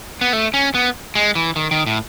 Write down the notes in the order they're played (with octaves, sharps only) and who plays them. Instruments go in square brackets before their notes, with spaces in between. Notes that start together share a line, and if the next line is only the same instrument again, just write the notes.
[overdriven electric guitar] B3
A3
C#4
B3
G#3
E3
D#3
D#3
A2